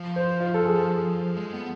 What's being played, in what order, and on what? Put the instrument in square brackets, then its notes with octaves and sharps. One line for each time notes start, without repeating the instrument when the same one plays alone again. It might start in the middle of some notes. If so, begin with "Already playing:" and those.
Already playing: [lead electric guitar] F3
[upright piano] C5
F4
A4
G#4
[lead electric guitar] G#3
B3